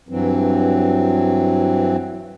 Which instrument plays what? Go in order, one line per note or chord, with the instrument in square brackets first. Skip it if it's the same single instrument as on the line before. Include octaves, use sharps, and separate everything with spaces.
[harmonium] G2 E3 F#3 C4